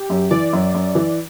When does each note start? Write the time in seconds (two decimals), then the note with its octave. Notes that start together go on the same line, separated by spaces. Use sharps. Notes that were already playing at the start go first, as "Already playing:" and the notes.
Already playing: G4
0.10 F#2
0.31 E3 D5
0.53 F#2
0.74 F#2
0.95 E3